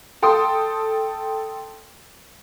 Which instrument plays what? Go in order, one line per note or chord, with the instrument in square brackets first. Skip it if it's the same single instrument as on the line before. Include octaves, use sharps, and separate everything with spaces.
[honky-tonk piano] A4 G5 C6 D#6